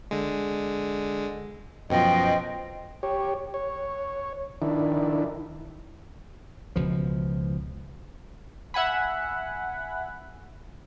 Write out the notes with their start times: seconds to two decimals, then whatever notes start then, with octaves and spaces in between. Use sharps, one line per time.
0.11 D3 G#3
1.90 F#2 B2 F3 C5 D#5 G5
3.03 G4 C#5
3.54 C#5
4.62 D#3 D4 E4
6.76 C#2 B2 F3
8.74 E5 F#5 G#5 B5